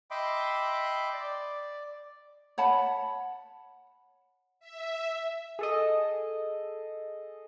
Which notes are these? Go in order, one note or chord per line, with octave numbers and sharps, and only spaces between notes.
D#5 E5 G5 B5 C6 D6
D5
C#5 F#5 A5 B5
E5
G#4 A4 D#5